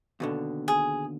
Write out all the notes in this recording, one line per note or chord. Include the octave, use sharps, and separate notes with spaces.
D#2 B2 D3
G#4